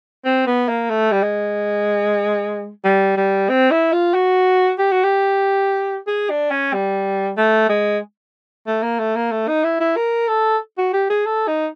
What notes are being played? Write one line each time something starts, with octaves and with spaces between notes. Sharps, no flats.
C4
B3
A#3
A3
G3
G#3
G3
G3
C4
E4
F4
F#4
G4
F#4
G4
G#4
D4
C#4
G3
A3
G#3
A3
A#3
A3
A#3
A3
D#4
E4
E4
A#4
A4
F#4
G4
G#4
A4
D#4